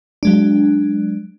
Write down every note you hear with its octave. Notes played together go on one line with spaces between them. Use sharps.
F#3 G#3 D4